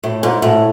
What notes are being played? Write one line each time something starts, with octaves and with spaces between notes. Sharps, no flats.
A2
G#2
A2